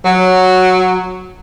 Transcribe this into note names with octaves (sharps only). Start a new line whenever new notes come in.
F#3